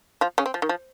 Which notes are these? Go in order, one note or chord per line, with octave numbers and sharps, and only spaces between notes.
F3 F4
C#3 C#4
C4
F3
D#3
F3